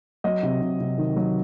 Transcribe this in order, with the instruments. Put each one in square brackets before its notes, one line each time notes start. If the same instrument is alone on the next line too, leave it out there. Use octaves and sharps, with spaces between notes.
[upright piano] F#3 D#5
C3
C3
C3
D#3
F#3